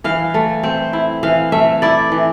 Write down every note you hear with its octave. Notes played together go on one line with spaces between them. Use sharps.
E3 F5
A3
C4
E4
E3 F5
A3 E5
E4 D5
E3